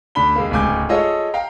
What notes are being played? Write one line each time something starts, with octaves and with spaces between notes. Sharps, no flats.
D2 D4 B5 G7
D#2 G#3 A#3
D1 C#2 G#2 G#5 D6 G6
F4 G#4 A4 C#5 D#5
F5 G5 A#5